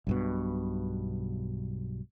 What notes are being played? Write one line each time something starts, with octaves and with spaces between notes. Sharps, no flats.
B1 G2 B2